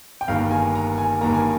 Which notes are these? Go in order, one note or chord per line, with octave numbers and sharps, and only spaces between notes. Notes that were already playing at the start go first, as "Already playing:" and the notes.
G5
G1 G2 D#3 A#3 F5
G#5
A#5
G#5
G1 G2 D#3 A#3 A#5
G#5